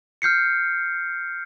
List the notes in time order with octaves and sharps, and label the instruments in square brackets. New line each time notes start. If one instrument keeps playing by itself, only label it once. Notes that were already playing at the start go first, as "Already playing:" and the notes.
[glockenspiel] F6 G6 C7 C#7